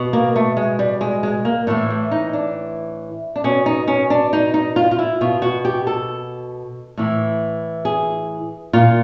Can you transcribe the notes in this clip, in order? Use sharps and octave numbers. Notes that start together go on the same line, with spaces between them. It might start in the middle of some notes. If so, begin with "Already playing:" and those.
Already playing: B2
A#3
A3
G#3
G3
G#3
G#3
A#3
A2 E3 A3
A3
D#4
D4
D4
B2 C#4
D#4
C#4
D4
D#4
D#4
F4
F4
E4
B2 F4
F#4
G4
A4
A2 E3
G#4
A#2 F4